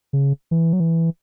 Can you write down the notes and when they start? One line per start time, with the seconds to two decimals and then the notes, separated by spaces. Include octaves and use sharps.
0.13 C#3
0.51 E3
0.73 F#3
0.80 E3